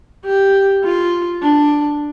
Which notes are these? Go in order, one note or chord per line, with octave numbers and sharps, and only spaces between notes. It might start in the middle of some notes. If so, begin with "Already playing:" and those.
G4
F4
D4